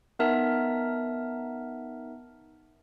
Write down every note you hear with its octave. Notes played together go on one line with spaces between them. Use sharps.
B3 D#4 A#4 E5 A5